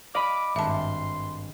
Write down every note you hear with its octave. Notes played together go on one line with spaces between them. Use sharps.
D5 D#5 F5 B5 D6
G#1 G2 E5 A5 C6